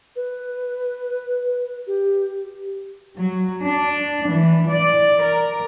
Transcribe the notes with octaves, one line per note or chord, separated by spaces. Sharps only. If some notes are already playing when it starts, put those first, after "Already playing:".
B4
G4
F#3
D4
E3
D5
A#4